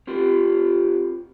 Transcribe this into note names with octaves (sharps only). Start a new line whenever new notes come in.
C4 F4 G4